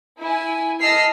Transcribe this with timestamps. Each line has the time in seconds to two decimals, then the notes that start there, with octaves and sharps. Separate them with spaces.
0.21 E4 G#5
0.80 D#5 A5 E6 F6 B6 C7